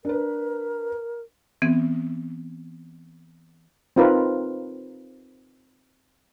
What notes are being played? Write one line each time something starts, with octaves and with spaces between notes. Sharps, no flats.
D4 A#4 B4
E3 B3 C4
C4 D#4 F4 A#4 B4